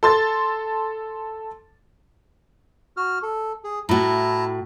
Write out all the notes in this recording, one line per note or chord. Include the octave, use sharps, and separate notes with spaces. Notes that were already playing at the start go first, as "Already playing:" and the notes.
A4 C6 A6
F#4 F6
A4
G#4
A2 E4 F#4 A5 A#5